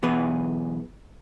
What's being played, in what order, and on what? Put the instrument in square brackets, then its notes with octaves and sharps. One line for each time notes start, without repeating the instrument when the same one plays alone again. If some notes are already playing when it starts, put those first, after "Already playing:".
[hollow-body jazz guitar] B1 E3 B3 G#4 B4